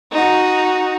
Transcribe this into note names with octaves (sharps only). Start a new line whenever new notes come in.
D#4 F#4